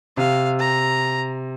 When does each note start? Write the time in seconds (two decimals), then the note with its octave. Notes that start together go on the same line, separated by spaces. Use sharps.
0.17 C3 F5
0.59 A#5